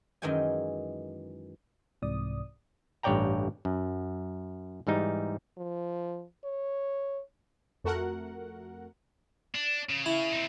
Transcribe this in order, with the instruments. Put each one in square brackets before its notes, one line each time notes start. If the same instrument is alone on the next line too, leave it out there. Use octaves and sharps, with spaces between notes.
[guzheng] F#2 D#3 E3 G#3 G5 G#5
[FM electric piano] C2 G#2 C3 E3 D5 D#6
[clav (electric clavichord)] A1 G2 C#5 D5 G5 A#5
F#2
G#2 E3 G3 D#4
[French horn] F3
C#5
[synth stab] F2 A3 F#4 A#4 F#5
[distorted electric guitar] D4
C#3
[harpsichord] E4
[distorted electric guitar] C4 D#4